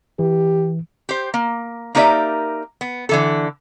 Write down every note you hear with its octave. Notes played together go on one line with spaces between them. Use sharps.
E3 G4
G4 C5
A#3
A#3 D#4 G4 A#4 D5 E5
B3
D3 E3 A4